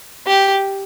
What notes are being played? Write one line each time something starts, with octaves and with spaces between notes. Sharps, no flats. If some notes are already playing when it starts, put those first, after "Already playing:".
G4